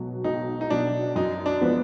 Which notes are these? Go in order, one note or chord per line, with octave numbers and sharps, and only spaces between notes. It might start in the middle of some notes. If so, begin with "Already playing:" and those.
Already playing: B1 B2 F#3
B1 D#4
D#4
B2 F#3 D4
F#2 D#4
D4
F3 B3